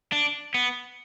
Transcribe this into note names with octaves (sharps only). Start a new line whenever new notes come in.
D4
B3